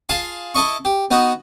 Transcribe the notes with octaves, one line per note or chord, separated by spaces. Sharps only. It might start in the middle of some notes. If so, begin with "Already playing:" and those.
F4 G#4 F5 G#5 A5
E4 A4 D#5 C#6
G4
B3 D#4 F#4